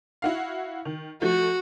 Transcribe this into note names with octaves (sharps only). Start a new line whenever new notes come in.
E4 F#4 F5
D#3
F3 A3 F#4